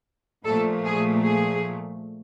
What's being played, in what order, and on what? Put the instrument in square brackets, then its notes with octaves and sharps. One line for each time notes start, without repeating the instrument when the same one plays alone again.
[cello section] A#2 F3 A3 A4
G#4
G#4